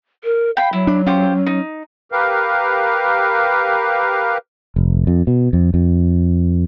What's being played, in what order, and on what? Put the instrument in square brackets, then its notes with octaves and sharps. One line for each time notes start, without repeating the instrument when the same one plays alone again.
[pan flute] A#4
[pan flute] F5 [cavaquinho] G5 B5
[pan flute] F#3 [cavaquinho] E4
[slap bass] D4
[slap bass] C#4 [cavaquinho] F4 G4 C5
[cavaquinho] D#4
[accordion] G4 A#4 B4 F5
[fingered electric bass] F1
F2
B2
F2
F2